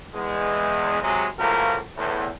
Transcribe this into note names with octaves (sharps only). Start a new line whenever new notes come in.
E2 G#3
C3 F#3 G#3 G#4
C#2 A2 F3 A#3 F#4 A#4
E2 A2